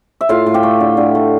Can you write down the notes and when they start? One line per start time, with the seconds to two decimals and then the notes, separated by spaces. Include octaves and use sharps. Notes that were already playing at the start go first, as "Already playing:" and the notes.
0.21 E5
0.29 A2 F4 F5
0.46 A2
0.54 G4 G5
0.63 A3
0.80 D3
0.97 D3
1.15 A3